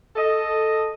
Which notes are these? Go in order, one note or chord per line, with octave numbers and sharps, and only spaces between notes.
A4 D#5